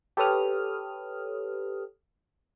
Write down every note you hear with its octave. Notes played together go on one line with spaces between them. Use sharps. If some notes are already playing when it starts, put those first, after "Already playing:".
G4 A4 B4 C#5 D#6 F6